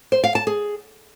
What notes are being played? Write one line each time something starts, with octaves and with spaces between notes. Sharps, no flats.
C5
F5
A5
G#4